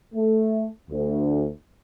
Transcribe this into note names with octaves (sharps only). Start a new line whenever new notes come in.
A3
D2